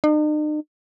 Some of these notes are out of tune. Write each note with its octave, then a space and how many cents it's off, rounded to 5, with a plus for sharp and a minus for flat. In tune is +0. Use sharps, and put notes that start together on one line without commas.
D#4 -45